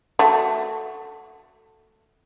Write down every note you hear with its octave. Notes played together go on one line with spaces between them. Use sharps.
A3 F#4